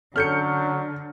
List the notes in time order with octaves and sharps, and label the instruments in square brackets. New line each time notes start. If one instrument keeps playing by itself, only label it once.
[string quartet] D3 [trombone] F#3 [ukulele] C#4 A4 C#5 [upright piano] F6 G6 C#7